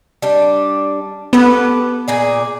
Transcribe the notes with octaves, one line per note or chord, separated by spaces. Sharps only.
G3 D4
B3 G4 A4 B4
A#2 G#4 D5